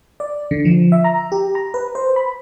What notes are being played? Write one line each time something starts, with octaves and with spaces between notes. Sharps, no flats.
D5
D3
F3
E5
A#5
G4
A#5
B4
C5
B5